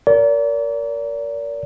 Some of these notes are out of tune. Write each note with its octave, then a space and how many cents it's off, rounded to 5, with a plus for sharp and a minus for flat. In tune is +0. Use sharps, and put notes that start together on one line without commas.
A#4 +0 D5 -40